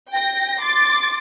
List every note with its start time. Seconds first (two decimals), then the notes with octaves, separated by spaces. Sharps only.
0.10 G5 A#6
0.62 C6 D6 A6